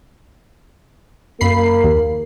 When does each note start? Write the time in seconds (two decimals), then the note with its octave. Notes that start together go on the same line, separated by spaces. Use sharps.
1.41 F#2 A#3 A#4 B5 C7
1.84 D#2